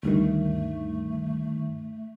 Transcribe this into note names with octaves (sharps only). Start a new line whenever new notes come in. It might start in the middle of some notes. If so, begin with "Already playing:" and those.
D2 G2 D#3 A3